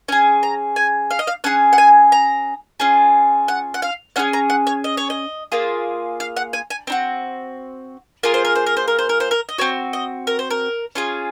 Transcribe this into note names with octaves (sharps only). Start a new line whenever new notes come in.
C#4 G#4 G#5
A#5
G#5
F5
D#5
F5
C#4 G#4 F#5
F#5
G#5
A#5
C#4 F4 G#4
F#5
F#5
F5
C#4 F4 G#4 F#5
A#5
F#5
C#5
D#5
C#5
D#5
A#3 F4 G#4
F5
F#5
G#5
G#5
C4 D#4 F#4
A#3 F4 G#4 A#4
C5
A#4
C5
A#4
C5
A#4
C5
A#4
C5
A#4
D#5
C4 F#4 C#5
D#5
A#4
C5
A#4
C#4 F4 G#4